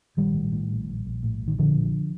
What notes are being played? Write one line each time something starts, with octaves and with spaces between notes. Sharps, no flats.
A#1 D#3 G3
A2
A2
A#1
A#1
A#1
A2
A#1
D#3
A#2 D3 F3
A#1